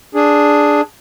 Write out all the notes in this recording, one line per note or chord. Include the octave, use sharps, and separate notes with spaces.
D4 G#4